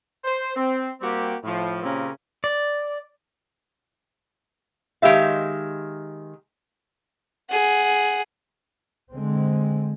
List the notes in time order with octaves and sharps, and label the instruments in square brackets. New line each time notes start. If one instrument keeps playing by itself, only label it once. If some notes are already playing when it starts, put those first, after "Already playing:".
[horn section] C5
C4
G3 A#3 C4 F#4 G4
A2 F3
A#2 C#3 C4 C#4 G4 A#4
[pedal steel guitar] D5
[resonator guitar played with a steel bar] D#3 G#3 G4 E5 F5
[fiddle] G#4 F#5
[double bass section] D3 G#3 C4